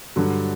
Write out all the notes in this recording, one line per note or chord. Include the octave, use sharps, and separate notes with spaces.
G2 D3 F#3